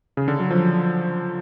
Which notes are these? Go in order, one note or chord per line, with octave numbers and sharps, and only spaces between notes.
C#3
D3
F#3
F3